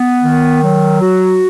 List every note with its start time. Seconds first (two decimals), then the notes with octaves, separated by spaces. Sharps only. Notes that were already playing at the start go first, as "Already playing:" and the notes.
Already playing: B3
0.23 D#3
0.62 F#3
1.01 F#4